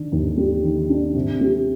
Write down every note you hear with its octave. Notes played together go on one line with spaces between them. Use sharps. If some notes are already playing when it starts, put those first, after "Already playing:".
Already playing: D#3 D4
D#2
G3
D#3
D4
C3
G3